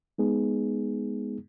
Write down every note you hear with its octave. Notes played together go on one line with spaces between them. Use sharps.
G#3 B3 D#4 G#4